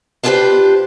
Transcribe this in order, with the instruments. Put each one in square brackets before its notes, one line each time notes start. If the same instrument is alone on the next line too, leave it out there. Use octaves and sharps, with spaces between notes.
[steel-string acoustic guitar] D4 F4 G4 G#4 B4 C5